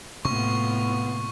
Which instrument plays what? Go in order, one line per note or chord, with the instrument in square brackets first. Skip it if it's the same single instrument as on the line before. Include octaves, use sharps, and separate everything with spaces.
[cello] A2 F4 [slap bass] C3 A#3 [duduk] B3 [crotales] C#6